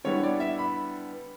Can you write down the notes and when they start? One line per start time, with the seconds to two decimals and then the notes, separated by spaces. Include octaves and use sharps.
0.04 D3 G3 B3 E4 C#5
0.23 D5
0.40 E5
0.59 B5